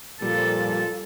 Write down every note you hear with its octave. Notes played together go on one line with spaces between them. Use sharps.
A#2 F3 G3 F4 A4